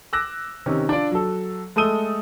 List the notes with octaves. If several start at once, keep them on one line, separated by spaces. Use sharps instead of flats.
D6 E6 F#6 A#6
C3 D#3 C#4
D4 F4 D5
F#3 A4
G#3 A3 A4 D#6 D#7 G7